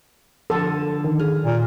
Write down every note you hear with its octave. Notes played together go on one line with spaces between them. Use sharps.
D3 F3 A4
D#3
G#4 F6
A#2